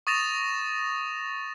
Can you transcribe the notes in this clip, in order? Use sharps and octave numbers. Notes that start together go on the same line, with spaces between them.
C#6 D#6 A6 A#6 E7 F7